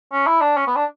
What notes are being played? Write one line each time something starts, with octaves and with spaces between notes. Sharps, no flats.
C#4
E4
D4
C#4
B3
D4